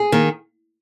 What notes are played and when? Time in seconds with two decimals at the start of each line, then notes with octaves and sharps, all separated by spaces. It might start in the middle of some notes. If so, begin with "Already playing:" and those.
Already playing: G#4
0.12 D#3 A#3